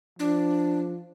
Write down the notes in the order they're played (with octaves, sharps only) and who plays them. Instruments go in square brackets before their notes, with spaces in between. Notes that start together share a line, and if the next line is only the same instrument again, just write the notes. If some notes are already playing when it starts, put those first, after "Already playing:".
[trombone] F3 [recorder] D4